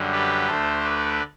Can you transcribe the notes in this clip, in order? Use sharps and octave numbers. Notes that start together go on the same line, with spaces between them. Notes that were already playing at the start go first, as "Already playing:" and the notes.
Already playing: F#2 D3 G3
G4 B4
D2 D3 A3 A4 C5
B4 D5